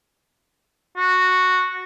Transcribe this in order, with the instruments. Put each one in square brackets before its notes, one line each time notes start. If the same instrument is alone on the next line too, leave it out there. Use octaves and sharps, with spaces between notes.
[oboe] F#4